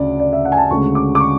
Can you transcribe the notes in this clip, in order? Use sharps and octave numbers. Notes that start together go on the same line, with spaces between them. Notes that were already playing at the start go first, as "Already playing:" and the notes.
Already playing: D2 C#3 D5
D5
E5
F#5
G#5
A5
D2 C#3 G#3 C#6
D6
D6
C#6